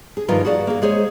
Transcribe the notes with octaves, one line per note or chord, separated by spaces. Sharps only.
G#4
G2 D#3 F3 F4 A#4 B4
F#4 G#4 D5 E5 F5
A#3 G#4
G#3 G#4 C5 C#5